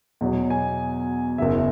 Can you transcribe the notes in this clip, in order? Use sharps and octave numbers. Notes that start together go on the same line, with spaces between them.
E2 B2 F#3
G#5
F#1 E2 C#3 E5